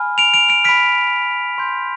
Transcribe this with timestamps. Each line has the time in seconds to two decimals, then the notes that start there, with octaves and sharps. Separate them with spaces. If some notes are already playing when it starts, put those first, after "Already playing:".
Already playing: G#5 B5 F6
0.18 D7 F7
0.34 D7 F7
0.49 D7 F7
0.64 B5 F6 B6 D7
1.58 C6 G6